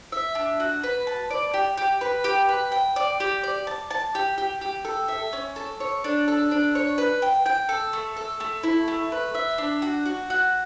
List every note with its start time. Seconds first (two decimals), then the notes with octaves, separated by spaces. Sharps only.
0.12 E5
0.35 D4
0.60 F#4
0.83 B4
1.07 A5
1.31 D5
1.54 G4
1.77 G4
2.01 B4
2.24 G4
2.49 B4
2.72 G5
2.96 D5
3.20 G4
3.43 D5
3.67 A5
3.91 A5
4.15 G4
4.38 G4
4.61 G4
4.85 A4
5.08 E5
5.33 C#4
5.56 A4
5.80 C#5
6.04 D4
6.28 A4
6.51 D4
6.75 C#5
6.98 B4
7.22 G5
7.46 G5
7.69 A4
7.93 A3
8.17 A4
8.40 A3
8.63 E4
8.88 A3
9.12 B4
9.35 E5
9.58 D4
9.82 F#4
10.05 F#4
10.30 F#4